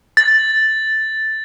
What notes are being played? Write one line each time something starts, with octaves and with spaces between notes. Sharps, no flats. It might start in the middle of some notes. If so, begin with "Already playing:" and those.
A6